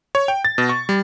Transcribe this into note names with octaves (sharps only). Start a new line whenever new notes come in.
C#5
G5
A6
B2
C#6
G3